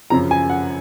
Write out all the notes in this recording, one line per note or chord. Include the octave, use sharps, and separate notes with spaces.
F#2 C#3 F3 A#5
G#5
F#5